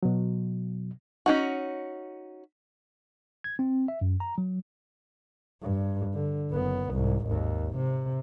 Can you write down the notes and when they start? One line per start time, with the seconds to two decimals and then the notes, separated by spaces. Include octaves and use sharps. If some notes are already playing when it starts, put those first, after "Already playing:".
0.03 B2 F#3
1.26 C#4 D#4 F#4
3.44 G#6
3.59 C4
3.88 E5
4.01 F#2
4.20 A#5
4.38 F#3
5.63 G2
6.14 D3
6.51 F#1 B3
6.91 C2 G#2
7.27 G#1 D#2
7.77 C3